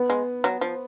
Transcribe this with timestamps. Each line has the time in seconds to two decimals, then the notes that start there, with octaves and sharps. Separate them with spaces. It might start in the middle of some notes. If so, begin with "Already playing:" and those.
Already playing: B3
0.10 G#3
0.44 F#3
0.61 F3